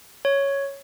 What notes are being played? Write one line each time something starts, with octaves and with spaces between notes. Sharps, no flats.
C#5